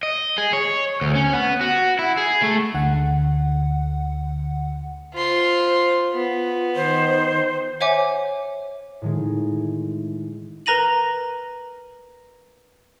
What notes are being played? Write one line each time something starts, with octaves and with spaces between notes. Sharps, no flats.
D#5
G#4
C#5
D2
C#4
B3
F#4
E4
G#4
A3
D2 D3 F#5
F4 C5 C6
B3 F4
D#3 C5
C5 C#5 E5 F#5 G#5 D6
A2 D#3 G#3
A#4 B4 A#5 A#6 D#7 F#7